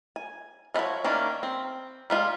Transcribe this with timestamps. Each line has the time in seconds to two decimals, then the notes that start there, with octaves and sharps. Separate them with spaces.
0.16 G#5
0.74 F3 A3 E4 F#4 C#5
1.04 D#3 A#3 C#4 D4 E4
1.43 C4
2.10 G3 G#3 F4